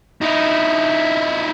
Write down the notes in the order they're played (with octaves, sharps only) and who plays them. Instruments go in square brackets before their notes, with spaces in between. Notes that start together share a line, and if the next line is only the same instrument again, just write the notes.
[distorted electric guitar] D#4 E4